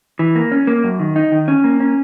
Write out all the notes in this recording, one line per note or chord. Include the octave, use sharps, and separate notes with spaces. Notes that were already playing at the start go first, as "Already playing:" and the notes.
E3
A#3
C#4
A#3
F#2
D#3
D#4
D#3
C#4
A#3
C#4